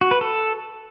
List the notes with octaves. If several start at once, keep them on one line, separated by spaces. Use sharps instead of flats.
F#4
B4
A4